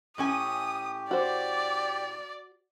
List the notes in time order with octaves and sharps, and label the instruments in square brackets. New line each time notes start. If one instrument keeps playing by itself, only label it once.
[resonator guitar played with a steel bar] A2 C#4 G#5 [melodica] G4 [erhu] D#6
[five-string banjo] F#4 C5 [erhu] D5